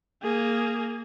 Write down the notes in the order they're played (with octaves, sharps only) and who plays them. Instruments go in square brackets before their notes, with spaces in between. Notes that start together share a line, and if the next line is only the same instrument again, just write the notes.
[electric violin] A#3 G#4